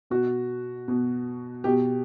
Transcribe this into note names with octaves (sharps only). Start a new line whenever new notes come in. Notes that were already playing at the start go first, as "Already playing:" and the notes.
B2 F#4
B2
B2 G4